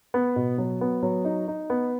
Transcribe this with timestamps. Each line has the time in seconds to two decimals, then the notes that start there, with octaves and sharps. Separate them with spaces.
0.14 B3
0.36 B2
0.58 F#3
0.81 B3
1.03 F#3
1.25 D#4
1.48 D#4
1.70 B3